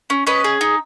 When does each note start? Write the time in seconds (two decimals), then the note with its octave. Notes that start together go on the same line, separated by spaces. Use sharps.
0.10 C#4
0.27 C#4 B4 D#5
0.44 G#4
0.61 D#4